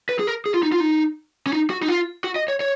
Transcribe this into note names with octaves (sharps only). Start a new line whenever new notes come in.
B4
G#4
A#4
G#4
F4
D#4
F4
D#4
C#4
D#4
F#4
D#4
F4
F#4
D#5
C#5
C#5